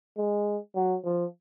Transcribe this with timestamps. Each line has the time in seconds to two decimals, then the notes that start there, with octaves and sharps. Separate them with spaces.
0.17 G#3
0.75 F#3
1.05 F3